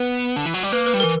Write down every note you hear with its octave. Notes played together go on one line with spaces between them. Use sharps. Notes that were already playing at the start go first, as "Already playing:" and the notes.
Already playing: B3 B4
D3
E3
F#3
G3
A#3 B4
B4
G3
E3 A#4